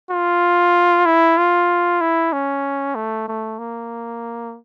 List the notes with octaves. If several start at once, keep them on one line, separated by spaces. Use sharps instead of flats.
F4
E4
F4
E4
C#4
A3
A3
A#3